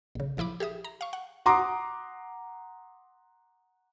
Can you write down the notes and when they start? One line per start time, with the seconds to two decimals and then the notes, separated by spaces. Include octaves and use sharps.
0.15 A#1 C#3
0.37 A#1 F3 E4 B5 D6
0.60 G4 G#4 E5 D#6
0.84 A#5
1.01 F5 C#6
1.13 F#5
1.46 F#5 A#5 C6 D6 D#6